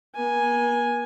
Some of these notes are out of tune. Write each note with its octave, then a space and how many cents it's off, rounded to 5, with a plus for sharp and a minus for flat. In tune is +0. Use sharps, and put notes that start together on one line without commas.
A#3 +45 G#5 +0